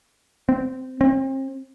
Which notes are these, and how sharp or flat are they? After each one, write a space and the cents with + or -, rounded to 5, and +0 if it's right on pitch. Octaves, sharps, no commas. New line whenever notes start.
C4 -15
C4 +35